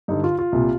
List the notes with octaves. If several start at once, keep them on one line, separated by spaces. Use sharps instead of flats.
G2 D3 D#4
F4
F4
C2 A#2